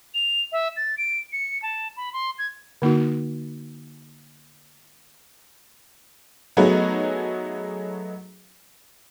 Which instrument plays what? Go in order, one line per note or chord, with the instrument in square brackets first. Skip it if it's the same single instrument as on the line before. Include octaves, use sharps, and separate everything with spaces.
[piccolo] F7
E5
A6
D7
C#7
A5
B5
C6
G#6
[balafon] D3 A#3 D#4 F#4
[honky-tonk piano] F#3 A3 B3 D#4 F#4 G#4